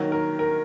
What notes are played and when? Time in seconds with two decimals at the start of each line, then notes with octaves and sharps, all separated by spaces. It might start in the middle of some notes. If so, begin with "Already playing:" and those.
Already playing: D#3 F#3 A#3
0.12 A#4
0.39 A#4